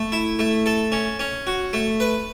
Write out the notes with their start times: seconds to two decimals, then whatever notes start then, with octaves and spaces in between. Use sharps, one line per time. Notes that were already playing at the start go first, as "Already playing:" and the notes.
Already playing: A3
0.12 E4
0.39 A3
0.66 A4
0.92 C#4
1.19 C#4
1.47 F#4
1.73 A3
2.00 B4